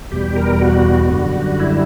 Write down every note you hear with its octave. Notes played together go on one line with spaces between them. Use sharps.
E2 B2 G3 G4
A#4
F#4
F#2 D3 G3
E4